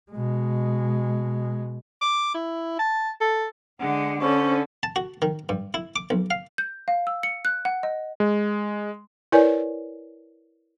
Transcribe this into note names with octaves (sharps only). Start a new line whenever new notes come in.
B2 G#3
D6
E4
A5
A4
D3 G#3 F#5
D3 C#4 C5 C#5 C#6
A5
F#4
D#3
G2
E4
D6
B1
F5
G6
F5
E6
C#7
F#6
F#5
D#5
G#3
E4 A#4 B4 C#5 D5 G#5